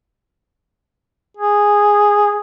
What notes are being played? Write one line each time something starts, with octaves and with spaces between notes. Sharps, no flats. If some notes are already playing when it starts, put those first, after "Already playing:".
G#4